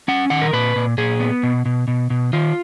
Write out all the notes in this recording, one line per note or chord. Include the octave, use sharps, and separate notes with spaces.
C#4 F#5
D#3 F#5
A#4
A#2 B4
A#2
A#2 G#4
B3
B2
B2
B2
B2
D#3 F4